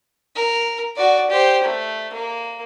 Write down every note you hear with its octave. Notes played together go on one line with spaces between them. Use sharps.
A#4
F#4 D5
G4 C5
A3
A#3